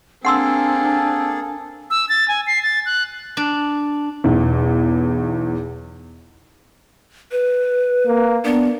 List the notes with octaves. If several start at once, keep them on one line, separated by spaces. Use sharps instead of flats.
A#3 C4 D4 G#4 A4 F#5 C6 E6
E6
A6
G#5
C7
A6
F#6
D4
B1 E2
B4
A#3
B3 D4